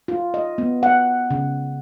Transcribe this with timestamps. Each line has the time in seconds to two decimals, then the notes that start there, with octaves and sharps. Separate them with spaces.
0.08 F4
0.34 D#5
0.58 B3
0.83 F#5
1.31 C#3